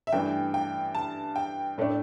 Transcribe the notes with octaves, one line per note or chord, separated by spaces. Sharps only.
E5
G2 E3 A3 D4 G5
G5
A5
G5
A2 A3 D4